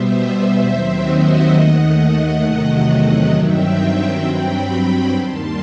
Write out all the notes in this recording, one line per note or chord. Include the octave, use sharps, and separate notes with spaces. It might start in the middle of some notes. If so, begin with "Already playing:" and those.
Already playing: B2 G3 B3 C5 E5
D#2 D#3 F#3 C4 C5 E5
D#5 F#5
D#2 D#3 A3
E2 C3 D#3 F#3 A3 D#5 F#5
D#5 F#5
G2 D#3 F#3 C4 E5 G5
G2 F#3 C4 G5 B5
D#2 D#3 G3 A5 C6